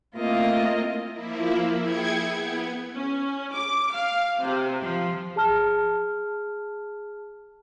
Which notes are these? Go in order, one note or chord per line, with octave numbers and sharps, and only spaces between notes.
A3 A#3 C4 E4 F4 D#5
F3 A#3 E4
E4 G#4 G5 G#5 G#6 C#7
B3
C#4
D6
F5
C3
F3
G#4 A5 F6